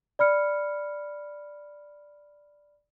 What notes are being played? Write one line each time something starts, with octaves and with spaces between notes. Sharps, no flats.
D5 B5 F6 C#7